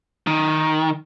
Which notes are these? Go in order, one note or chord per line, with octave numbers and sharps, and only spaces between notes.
D#3